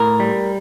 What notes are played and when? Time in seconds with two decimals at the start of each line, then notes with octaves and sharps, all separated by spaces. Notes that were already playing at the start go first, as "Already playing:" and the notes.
Already playing: A2 A#4
0.20 G3